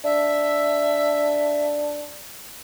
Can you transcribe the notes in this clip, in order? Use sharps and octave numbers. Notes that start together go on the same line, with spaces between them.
D4 E5